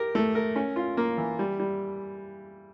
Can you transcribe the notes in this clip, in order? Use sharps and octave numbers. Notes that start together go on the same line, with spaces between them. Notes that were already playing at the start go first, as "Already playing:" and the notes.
Already playing: G4 A#4
A3
A#4
C#4
F4
A#3
E3
G3
G3